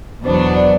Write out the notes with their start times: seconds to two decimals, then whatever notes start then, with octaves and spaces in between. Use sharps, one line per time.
0.25 E2 B2 F#3 B3 D4 C5
0.56 D5